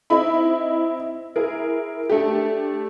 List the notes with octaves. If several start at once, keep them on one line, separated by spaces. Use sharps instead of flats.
C4 D#4 E4 B5
E4 G#4 A#4
A3 D4 G4